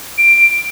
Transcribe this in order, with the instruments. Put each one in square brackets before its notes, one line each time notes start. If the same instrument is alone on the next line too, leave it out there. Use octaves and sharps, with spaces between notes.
[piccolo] D7